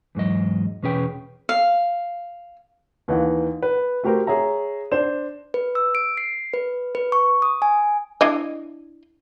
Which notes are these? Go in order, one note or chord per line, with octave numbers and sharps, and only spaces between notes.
E2 G#2 F#3 D#5
E2 B2 C#4 G#4 B4 G5
F5
D#2 E3 D#4 F5 F#5
B4
A3 F#4 G4 A#4 C5
G#4 C#5 E5 A#5
D4 C5 E7
B4
E6
D7
C7
B4
B4
C#6
D#6
G#5
D4 E4 D#5